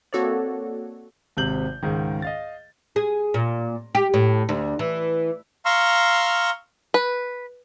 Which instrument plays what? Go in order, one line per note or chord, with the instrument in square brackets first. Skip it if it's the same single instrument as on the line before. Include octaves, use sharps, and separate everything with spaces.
[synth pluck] A#3 C4 F#4 A4 C#5 D5
[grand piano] G#1 C3 G6 F#7
C#2 G#2 D#3
D#5 F5 A6
[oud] G#4
A#2
G4
A2
D2
E3
[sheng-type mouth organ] F5 A#5 C6 C#6 E6 F6
[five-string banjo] B4